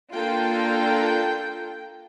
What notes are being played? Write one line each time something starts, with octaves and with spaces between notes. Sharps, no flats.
A#3 D4 F4 A4 G5